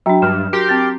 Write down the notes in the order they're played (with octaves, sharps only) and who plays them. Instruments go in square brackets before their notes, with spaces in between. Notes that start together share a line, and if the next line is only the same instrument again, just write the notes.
[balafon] F#3 D4 [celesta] F#4 G5 A#5
[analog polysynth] G2 [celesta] F6 E7
[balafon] F#4 [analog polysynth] G4 A#4 C6
[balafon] C4 G5 [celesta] A6